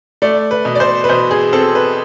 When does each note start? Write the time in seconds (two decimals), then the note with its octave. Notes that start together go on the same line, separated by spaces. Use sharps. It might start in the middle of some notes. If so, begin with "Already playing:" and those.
0.22 A3 D5
0.51 B4
0.65 B2
0.75 D5
0.80 C5
1.04 B4
1.09 B2 C5
1.31 G#4
1.53 C4 A4
1.75 B4